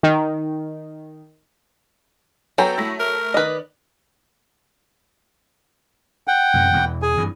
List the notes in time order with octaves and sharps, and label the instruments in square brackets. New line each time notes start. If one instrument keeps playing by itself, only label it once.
[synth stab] D#3
[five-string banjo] F#3 [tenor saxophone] B3 [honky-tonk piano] A4 G5 A#5
[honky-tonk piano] A3 A#6 [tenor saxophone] E4
[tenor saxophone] A#4
[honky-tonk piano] D#3 D5 [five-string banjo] B4 D#5
[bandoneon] F#5 G5
[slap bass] F#2 A2 C3
E2 B2 E3
[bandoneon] G#4 G#5
[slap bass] G2 E3